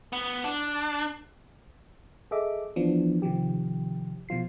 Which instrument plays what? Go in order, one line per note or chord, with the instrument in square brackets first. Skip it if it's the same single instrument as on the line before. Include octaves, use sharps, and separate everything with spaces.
[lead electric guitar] B3
D4
[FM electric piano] G#4 A4 D#5 E5 D6
E3 F3 B3 D4
C3 D#3 F3 G4
B2 F3 F4 C7